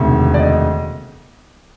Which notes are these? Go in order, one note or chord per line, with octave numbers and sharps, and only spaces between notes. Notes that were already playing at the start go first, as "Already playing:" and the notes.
Already playing: E1 D2 C3 D#3
D5
D#5